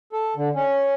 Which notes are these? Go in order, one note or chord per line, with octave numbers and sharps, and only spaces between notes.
A4
D3
C#4